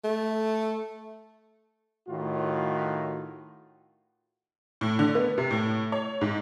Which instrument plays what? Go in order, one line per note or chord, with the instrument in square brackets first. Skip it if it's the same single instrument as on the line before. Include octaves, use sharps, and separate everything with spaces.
[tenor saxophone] A3
[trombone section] A2 D#3 F4 F#4
[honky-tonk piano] A2
D3
B3
C3
A2
C#5
G#2